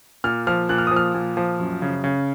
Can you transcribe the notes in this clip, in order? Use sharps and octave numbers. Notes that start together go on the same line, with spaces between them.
A#2 F6
F3 F6
A#2 F#6
F6
D#6
F3
F6
A#2
F3
F#2
C#3
C#3